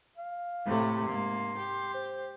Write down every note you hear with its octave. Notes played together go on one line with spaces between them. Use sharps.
F5
A2 C3 A3
G#2 A#3 C6
G4
C5